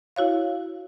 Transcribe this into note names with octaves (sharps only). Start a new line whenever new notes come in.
E4 F#4 C#5 F5